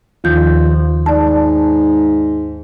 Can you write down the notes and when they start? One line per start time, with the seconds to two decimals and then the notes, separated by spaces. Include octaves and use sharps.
0.24 D#2 D#3 F3 G6
1.06 G#2 D5 A5